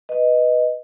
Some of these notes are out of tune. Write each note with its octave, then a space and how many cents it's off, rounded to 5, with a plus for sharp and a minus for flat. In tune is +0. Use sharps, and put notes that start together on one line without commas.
B4 +0 D#5 +0